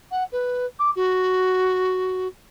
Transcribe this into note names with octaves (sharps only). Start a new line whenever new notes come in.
F#5
B4
D6
F#4